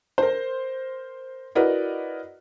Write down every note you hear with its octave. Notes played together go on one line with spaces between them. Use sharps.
A#4 C5
E4 F#4 A#4 B4 D5 D#5